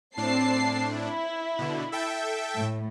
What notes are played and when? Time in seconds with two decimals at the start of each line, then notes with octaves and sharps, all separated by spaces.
0.17 A2 C4 D4 A5 C7
0.96 E4
1.59 B2 D3
1.92 A4 E5 G5
2.55 A2